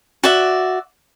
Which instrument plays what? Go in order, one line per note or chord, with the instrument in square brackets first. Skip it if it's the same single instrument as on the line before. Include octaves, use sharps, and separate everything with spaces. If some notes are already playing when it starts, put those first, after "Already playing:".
[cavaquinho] F#4 D5 E5